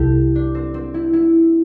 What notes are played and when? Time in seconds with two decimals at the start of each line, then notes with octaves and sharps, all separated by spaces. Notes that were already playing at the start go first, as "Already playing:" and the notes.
Already playing: C2 E4 G4 A4
0.35 D4
0.55 C4
0.74 C4
0.94 E4
1.13 E4